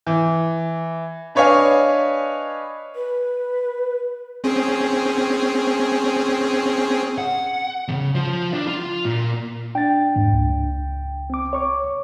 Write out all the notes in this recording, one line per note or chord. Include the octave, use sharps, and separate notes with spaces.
E3
D4 B4 C#5 D#5 F5 G#5
B4
C4 C#4 G#4
F#5
E2 C#3
F3 F4
D4
F4
A#2
D4 G5 A6
E2 G#2 A#3
C#2
C4 D6
C#5 C#6 D6